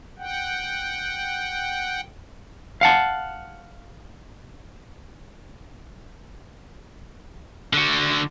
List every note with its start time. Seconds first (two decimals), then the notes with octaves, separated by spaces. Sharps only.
0.19 F#5 G5
2.81 F5 F#5 A5
7.73 D3 F#4